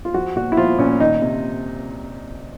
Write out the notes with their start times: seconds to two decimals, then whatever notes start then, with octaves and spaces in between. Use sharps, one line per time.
0.05 F4
0.14 F3 F#4
0.36 A#2 F#4
0.52 E4
0.57 F3 F4
0.78 A#2 C#4
1.00 D#3 D#4
1.22 C3